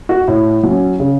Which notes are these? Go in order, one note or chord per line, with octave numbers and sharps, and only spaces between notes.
F#4
A2
F#3
C#4
C#3